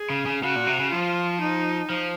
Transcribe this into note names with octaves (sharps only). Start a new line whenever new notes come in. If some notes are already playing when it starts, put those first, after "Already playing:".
Already playing: G#4
C#3
C#3
C#3 F#4
A#2
C3
C#3
F3 F4
D#4
F3